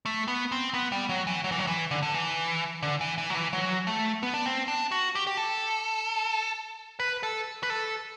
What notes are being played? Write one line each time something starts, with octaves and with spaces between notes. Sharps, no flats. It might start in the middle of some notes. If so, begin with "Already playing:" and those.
A3
B3
C4
B3
G3
F#3
E3
F#3
E3
F#3
E3
D3
D3
E3
D3
E3
E3
F#3
E3
F#3
A3
B3
D4
C4
D4
F#4
G4
G4
A4
B4
A4
B4
A4